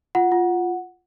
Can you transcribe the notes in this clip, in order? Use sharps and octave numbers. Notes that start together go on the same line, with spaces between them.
F4 F#5
F4